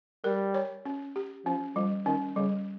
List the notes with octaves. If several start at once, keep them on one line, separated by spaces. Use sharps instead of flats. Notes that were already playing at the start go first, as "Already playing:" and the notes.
G3 A#4
C#5
C#4
G4
F3 C#4
F3 G3
D#3 C#4
C#3 G3